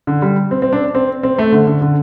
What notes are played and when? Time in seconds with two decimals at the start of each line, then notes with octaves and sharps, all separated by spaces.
0.07 D3
0.22 G3
0.51 C4
0.62 C4
0.73 D4
0.95 C4
1.23 C4
1.38 A3
1.52 D3
1.67 D3
1.81 D3